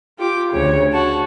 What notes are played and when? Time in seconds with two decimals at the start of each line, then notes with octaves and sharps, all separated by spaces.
0.19 F4 G4 D6
0.52 D2 C#3 C#5
0.92 F#4 A5